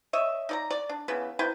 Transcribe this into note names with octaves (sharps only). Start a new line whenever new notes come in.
C#5 D#5 E5
D#4 D5 A#5
D5
D4
C#3 E3 B3
C3 E4 B4 G5